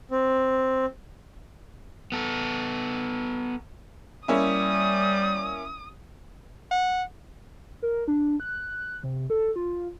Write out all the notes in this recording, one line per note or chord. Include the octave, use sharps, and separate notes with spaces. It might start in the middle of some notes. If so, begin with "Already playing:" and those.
C4
B3 A4
G3 A#3 C#4 E4 D#6
F#5
A#4
D4
F#6
C3
A4
F4